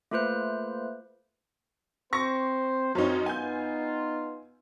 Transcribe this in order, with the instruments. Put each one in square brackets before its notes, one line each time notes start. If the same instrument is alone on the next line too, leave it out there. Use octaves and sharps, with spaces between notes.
[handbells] A3 A#3 F4 B4 C5 F#6
[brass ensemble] C4 C5 [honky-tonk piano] C#6 A#6
[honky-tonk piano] F#2 D#4 [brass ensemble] F3 C4 C#5
[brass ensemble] B3 D#4 F4 [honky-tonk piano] G#5 G6